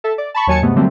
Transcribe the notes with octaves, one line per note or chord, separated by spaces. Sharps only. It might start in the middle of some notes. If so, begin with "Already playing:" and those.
A4 E5
D5
A5 B5 C#6
D#2 F#3 C#5 G#5 A5 C#7
G2 C3 G#3 A3 B3
D3 F#3 G3 A3 A#3 C4